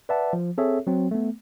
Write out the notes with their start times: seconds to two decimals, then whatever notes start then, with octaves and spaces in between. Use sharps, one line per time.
0.09 B4 D5 E5 F#5 A5
0.33 F3
0.58 C4 G#4 A4 C#5 E5
0.87 F#3 C4
1.11 A3 B3